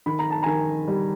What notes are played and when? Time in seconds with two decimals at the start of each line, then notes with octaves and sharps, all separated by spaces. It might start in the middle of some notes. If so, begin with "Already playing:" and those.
0.06 D#3 B5
0.19 A#5
0.30 A5
0.43 D#3 G#5 A#5
0.88 G3